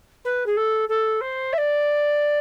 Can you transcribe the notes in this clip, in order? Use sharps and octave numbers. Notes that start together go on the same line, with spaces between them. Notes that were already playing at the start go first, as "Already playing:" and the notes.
B4
G#4
A4
A4
C5
E5
D5